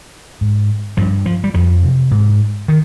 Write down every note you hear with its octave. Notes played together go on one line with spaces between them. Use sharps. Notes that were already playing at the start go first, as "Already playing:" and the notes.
G#2
G2 F3
F3
G3
F2 F3
C3
G#2
D#3